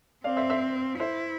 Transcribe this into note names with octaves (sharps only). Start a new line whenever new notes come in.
C4 D5 F5
C5 E5
C5 E5
E4 C5 E5